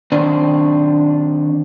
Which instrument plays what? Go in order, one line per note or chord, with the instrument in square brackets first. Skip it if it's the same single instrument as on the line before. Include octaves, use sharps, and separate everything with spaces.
[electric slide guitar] D#3 C4 D4 C5 D5